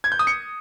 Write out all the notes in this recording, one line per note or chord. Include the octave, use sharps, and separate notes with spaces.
G#6
G6
D#6
C#7